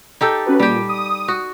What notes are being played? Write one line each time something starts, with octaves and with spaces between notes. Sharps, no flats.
D#4 G4 A4
C#4 F#4 B4
A#2 G3 G4
D#6
F#4